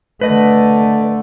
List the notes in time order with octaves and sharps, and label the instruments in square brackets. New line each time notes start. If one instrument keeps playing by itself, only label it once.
[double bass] D3 A3 [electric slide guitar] B4 D#5